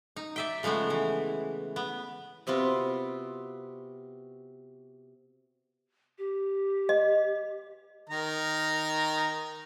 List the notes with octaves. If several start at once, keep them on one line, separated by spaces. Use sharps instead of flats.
D#4
D5 E5 G5
C#3 F3 G#3 A3 B3
E3
B3
C3 B3 C4 F4 F#4
G4
D#5
D#3 A#4 A#5